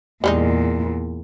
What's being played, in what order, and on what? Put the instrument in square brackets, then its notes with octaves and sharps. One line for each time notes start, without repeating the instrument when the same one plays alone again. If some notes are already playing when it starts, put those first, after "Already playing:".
[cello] E2 A#2 [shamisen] G3 G#3 D#4